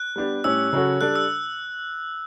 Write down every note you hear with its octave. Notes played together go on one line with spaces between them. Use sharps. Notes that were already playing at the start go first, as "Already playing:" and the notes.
Already playing: F#6
G3 B3 D4 G4
A2 G3 C#4 G4 E6
C#3 F#3 C#4 F#4 A4
G3 D4 A4 F#6
E6